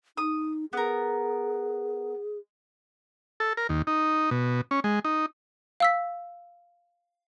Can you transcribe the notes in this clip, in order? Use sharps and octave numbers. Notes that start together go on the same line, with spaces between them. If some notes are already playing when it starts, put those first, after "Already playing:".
D#4 D#6
B3 G#4 A#4
A4
A#4
D#2
D#4
B2
C#4
G#3
D#4
F5 E6 B6